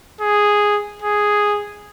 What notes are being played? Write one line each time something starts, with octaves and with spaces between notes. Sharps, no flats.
G#4
G#4